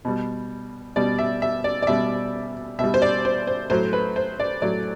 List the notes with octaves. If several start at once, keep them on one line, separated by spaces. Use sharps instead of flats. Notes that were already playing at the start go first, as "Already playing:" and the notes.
B2 G3
B2 G3 D5
E5
E5
D5
D5
B2 G3 E5
B2 G3 E5
C5
D5
C5
C5
A2 F#3 C5
B4
C5
D5
A2 F#3 D5